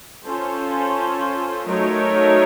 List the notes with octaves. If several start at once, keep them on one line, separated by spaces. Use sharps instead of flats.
C#4 F4 A4 C5
F#3 A3 D#4 A#4 C#5